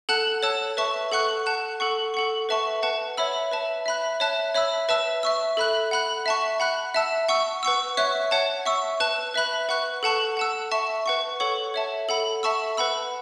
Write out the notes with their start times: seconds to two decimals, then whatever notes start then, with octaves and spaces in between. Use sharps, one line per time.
0.09 A4 F#5 A5 F#6
0.43 C#5 A5 E6
0.77 B4 E5 A5 C#6
1.12 A4 F#5 C#6 F#6
1.46 F#5 A5 F#6
1.80 A4 F#5 C#6
2.14 A4 F#5 C#6
2.49 B4 E5 A5 C#6
2.83 B4 F#5 A5
3.17 C#5 E5 B5 E6
3.51 B4 E5 A5
3.86 E5 B5 F#6
4.20 C#5 E5 A5 F#6
4.55 C#5 E5 B5 E6
4.89 B4 E5 A5 E6
5.23 E5 C#6 E6
5.57 A4 E5 B5 F#6
5.91 F#5 B5 F#6
6.26 E5 A5 C#6
6.60 F#5 B5 F#6
6.94 E5 A5 E6
7.29 F#5 C#6 E6
7.63 B4 F#5 C#6 E6
7.97 C#5 E5 C#6 F#6
8.31 C#5 F#5 A5
8.66 E5 C#6 E6
9.00 B4 A5 F#6
9.34 B4 E5 B5 F#6
9.69 B4 F#5 C#6 F#6
10.03 A4 F#5 A5 C#6 F#6
10.37 F#5 A5 E6
10.71 E5 A5 C#6
11.06 B4 F#5 C#6
11.40 A4 C#5 F#5 C#6
11.74 C#5 E5 A5
12.09 A4 F#5 B5
12.43 E5 A5 C#6 E6
12.77 B4 F#5 B5 E6